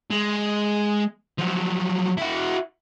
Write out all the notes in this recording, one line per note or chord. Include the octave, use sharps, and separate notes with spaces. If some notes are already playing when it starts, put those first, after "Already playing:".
G#3
F3 F#3
E4 F#4